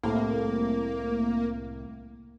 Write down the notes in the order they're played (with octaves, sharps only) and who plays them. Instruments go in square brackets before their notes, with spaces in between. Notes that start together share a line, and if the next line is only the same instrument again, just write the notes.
[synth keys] C2 A2 C3 [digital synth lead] A#3